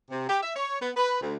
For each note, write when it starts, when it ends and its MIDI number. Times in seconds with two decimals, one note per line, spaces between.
0.11 0.25 48
0.29 0.39 67
0.43 0.54 76
0.55 0.78 73
0.82 0.91 59
0.97 1.18 71
1.21 1.36 38